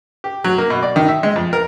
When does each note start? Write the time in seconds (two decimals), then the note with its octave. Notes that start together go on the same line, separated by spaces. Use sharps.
0.24 G4
0.44 F#3
0.58 A#3
0.70 B2
0.83 D5
0.96 D#3
1.08 E5
1.23 G#3
1.36 F2
1.53 A#4